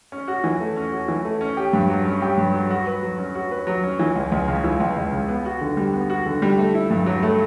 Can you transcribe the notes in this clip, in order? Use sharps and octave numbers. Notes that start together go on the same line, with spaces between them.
C#4
F#4
E3
A3
C#4
F#4
E3
A3
C#4
G4
G2
F#3
C#4
G4
G2
F#3
F#4
B4
F#3
C#4
F#4
B4
F#3
C#4
E3
C#2
C#2
C#3
E3
C#2
C#2
C#3
B3
F#4
D3
G3
B3
F#4
D3
G3
A3
E4
G2
F#3
A3